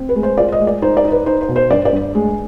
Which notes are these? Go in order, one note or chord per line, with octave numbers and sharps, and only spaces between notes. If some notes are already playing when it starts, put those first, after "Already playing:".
Already playing: C4
B4
G#3
C5
F4 D5
D#5
G#3
D5
D#4 C5
D5
D#4
B4
D#4 C5
C5
B2
C5
G2 D5
D5
G2
G#3